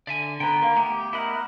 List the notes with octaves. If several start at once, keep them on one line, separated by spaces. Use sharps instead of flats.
D3 D5 E5 G#5
D3 B3 G5 A#5
A#3
A3 B3 G4
E4 A#4 D#5 F#5